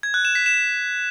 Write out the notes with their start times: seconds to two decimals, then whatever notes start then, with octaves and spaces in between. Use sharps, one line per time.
0.03 G#6
0.14 F#6
0.25 E7
0.35 B6
0.46 E7